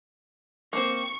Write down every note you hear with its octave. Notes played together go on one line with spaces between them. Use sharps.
A#3 C4 C#6